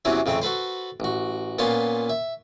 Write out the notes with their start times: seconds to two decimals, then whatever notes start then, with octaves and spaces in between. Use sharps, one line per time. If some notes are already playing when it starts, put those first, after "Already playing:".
0.05 E2 C3 E3 F#3 C4 C#4
0.26 F2 C#3 A3 C4
0.42 F#4 A4 B4 C5
1.00 A1 F#4
1.59 A#2 B3 C#4 F4 A5 C6
2.09 E5